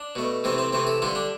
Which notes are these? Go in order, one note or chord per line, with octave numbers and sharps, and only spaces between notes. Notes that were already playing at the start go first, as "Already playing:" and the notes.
Already playing: D4
B2 A3
C3 E3 A3 C4
C4
C3 E3 A3 C4
A4
D3 G3 F4
D4